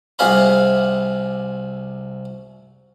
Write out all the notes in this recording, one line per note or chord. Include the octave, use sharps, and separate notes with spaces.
C2 C3 G#4 F5 F#5 B5